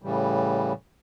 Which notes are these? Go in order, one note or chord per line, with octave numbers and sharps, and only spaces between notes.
A2 C#3 E3 G3